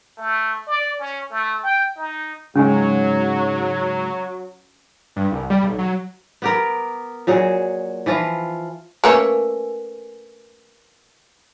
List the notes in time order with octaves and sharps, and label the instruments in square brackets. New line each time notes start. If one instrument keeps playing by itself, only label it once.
[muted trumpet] A3
D5
C#4
A3
G5
D#4
[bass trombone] G#2 [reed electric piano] C#3 G#3 [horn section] F#3 [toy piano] C#4 G#4 G#5
[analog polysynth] G2
C2
G3
B1
F#3
[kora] B3 G4 A#4
A#2 F#3 F#4 G#4
E3 F3 F4
[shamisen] A3 A#3 C#4 [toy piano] A#4 B4 G#5